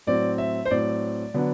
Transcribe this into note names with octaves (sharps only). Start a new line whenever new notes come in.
A2 F#3 C4 D5
E5
C5
A2 F#3 C4 D5
D3 F#3 B3 D4